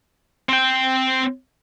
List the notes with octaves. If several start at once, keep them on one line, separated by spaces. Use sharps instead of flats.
C4 G5